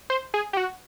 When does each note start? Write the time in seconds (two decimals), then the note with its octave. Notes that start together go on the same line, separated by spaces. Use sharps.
0.10 C5
0.34 G#4
0.53 G4
0.57 F#4